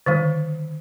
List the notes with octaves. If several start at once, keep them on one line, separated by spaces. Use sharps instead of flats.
D3 D#3 G3